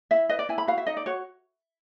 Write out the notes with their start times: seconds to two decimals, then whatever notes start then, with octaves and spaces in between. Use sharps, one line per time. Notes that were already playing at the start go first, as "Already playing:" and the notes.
0.11 E4 E5
0.29 B4 D#5
0.39 D5
0.49 E4 G#5
0.58 B5
0.67 F#4 F5
0.78 E5
0.87 D#4 D#5
0.97 D5
1.06 F#4 C#5